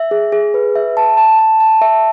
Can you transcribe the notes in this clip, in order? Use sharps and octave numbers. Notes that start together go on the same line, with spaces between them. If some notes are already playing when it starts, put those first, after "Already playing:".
Already playing: E5
G#4
G#4
B4
E5
A5
A5
A5
A5
E5